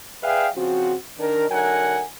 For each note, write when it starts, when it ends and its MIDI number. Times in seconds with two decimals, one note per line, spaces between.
0.23 0.48 68
0.23 0.48 71
0.23 0.48 74
0.23 0.48 76
0.23 0.48 77
0.23 0.48 79
0.56 0.94 49
0.56 0.94 53
0.56 0.94 60
0.56 0.94 66
1.18 1.47 51
1.18 1.47 62
1.18 1.47 70
1.50 2.02 50
1.50 2.02 54
1.50 2.02 63
1.50 2.02 70
1.50 2.02 78
1.50 2.02 80